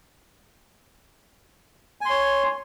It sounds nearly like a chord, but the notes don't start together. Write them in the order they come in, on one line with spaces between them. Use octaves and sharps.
G#5 C6 C#5